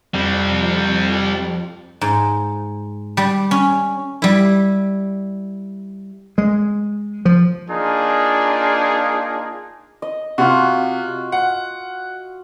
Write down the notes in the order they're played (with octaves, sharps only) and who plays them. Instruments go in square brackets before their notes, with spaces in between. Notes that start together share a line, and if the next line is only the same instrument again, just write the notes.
[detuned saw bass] F2 [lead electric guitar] G3 C4
[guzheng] G#2
G3
C#4
G3 E4
[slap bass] G#3
F3
[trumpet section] A#3 D4 D#4 F4 G#4
[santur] D#5
[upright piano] C3 [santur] F4 F#4
[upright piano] F#5